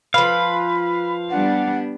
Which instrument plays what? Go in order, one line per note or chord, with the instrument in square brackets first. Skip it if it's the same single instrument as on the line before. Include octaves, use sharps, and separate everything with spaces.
[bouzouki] F3 B4 [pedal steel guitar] F5 [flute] B5
[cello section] G3 B3 D4 [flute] F#5